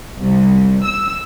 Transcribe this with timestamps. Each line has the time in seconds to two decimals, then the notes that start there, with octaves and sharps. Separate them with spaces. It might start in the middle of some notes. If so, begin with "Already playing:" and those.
0.20 C2
0.87 E6